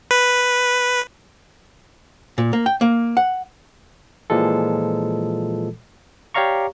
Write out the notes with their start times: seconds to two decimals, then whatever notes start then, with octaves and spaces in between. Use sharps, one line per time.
0.11 B4
2.38 A#2
2.53 A#3
2.66 G5
2.81 A#3
3.17 F#5
4.30 A#2 E3 F3 G#3 A4
6.34 G4 C#5 D5 F5 A#5 C#6